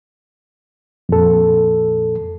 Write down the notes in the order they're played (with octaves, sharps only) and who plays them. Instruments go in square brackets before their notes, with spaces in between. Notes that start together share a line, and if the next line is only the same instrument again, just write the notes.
[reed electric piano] F2 A#2 A4